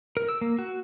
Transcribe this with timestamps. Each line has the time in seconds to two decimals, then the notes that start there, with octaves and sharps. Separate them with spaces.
0.17 A#4
0.28 E6
0.41 A#3
0.59 F#4